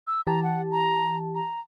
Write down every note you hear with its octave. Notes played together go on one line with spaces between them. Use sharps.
E6
E3 G4 A5 A#5
F#5
A#5
A#5